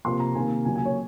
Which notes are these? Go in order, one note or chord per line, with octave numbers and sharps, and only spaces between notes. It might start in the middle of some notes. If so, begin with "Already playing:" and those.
C3 F3 A#3 C6
A#5
C3 D#3 A#3 G#5
C#3 F#3 A#3 G#5
G#5
C#5